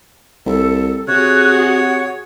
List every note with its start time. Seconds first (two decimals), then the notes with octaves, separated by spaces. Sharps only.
0.46 C2 A4
1.08 C3 F#4 G#4 C#5 F#6
1.52 F#5